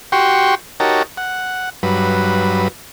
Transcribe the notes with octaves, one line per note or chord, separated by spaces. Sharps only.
F#4 G4 G5 C6 C#6
D#4 F#4 G4 A#4 C#5 A5
F#5
G2 F#3 B4